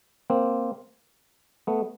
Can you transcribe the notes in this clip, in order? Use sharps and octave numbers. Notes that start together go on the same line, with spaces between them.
A#3 C4
A3 B3